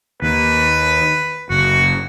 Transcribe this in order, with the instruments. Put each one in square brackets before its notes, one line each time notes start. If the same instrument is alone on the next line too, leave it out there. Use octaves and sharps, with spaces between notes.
[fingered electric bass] D#2 [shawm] B4
[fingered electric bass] F#1 [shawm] F#4